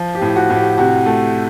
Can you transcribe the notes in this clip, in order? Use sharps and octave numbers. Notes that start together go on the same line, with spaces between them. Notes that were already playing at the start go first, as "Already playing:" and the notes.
Already playing: F3
G4
A2
F#4
A2
G4
C3 F#4
A3